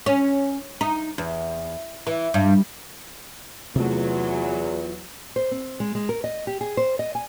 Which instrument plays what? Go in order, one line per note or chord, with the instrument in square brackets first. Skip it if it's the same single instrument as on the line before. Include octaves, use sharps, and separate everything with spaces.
[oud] C#4
D#4
E2
E3
G2
[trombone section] E2 [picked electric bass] C3 A3 [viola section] F#3 [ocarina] F4
[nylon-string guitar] C5
C4
G#3
G#3
A#4
D#5
G4
G#4
C5
D#5
G#5